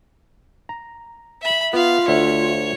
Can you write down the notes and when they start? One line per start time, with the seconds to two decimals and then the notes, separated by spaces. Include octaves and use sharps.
0.69 A#5
1.41 E5 B5
1.73 B3 F4 F5
2.08 D2 C#5 E5 F#5